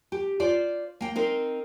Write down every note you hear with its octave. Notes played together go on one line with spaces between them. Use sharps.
G4
F4 C5 D5
A#3 G5
C4 D#4 A#4 C5